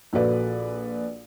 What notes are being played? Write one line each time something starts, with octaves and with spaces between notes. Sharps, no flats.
A#1 F#4 A4 B4 D5